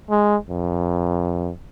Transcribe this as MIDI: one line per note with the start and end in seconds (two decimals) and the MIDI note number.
0.10 0.36 56
0.49 1.51 41